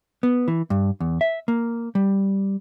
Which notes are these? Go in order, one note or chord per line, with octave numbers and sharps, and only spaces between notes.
B3
E3
G2
E2
E5
A#3
G3